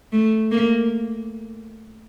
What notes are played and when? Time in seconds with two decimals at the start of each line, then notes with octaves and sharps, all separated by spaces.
0.13 A3
0.51 A#3